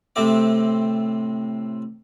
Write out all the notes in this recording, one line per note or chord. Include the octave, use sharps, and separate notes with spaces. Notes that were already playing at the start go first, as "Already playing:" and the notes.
A2 C3 C4 D6